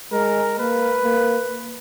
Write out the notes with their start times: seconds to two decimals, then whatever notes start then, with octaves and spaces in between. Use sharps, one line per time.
0.12 G#3 A#4
0.59 A#3 B4
1.05 A#3